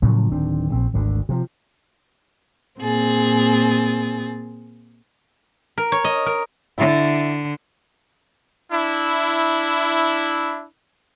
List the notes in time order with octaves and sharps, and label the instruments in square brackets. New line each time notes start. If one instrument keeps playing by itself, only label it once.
[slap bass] A2 C#3 F3 F#3
D1 D#3 C4 D4
A#1 C4
G#1 D2 D3
C3 F3
[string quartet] A#2 C4 G#4 A6
[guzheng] A#4
C#5
D#5
A#4
[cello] D3 [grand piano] E4
[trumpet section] D4 E4